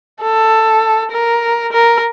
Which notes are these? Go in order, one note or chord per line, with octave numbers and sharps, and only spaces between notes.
A4
A#4
A#4